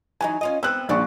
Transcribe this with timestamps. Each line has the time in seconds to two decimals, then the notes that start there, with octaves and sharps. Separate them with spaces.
0.21 E3 F#3 D#4 G#5
0.41 C#4 F4 D#5
0.63 B3 C4 E6 F#6
0.89 A#1 C#3 E3 F3 D5 C#6